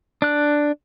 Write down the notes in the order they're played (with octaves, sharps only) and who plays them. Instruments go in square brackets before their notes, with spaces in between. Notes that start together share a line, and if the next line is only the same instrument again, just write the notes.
[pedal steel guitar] D4 F#6